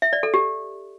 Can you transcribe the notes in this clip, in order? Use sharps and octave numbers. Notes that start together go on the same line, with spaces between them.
E5
D5
A4
G4